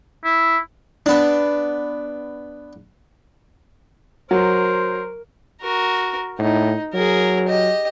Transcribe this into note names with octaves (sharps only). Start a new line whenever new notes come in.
E4
B3 D4
F#3 A#4 C5
F#4 A#4
A2 D#4
F#3 G#4 A#4
G4 D#5